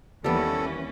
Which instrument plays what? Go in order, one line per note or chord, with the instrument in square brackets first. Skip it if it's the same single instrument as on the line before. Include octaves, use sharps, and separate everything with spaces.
[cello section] D#2 E3 C#4 [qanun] G3 B3 [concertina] A4